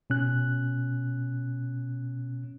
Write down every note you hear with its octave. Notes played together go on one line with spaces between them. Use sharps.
B2 C#4 F#6